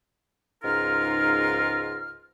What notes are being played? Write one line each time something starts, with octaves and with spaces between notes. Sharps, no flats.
C#2 G#2 D#4 F4 A#4 F6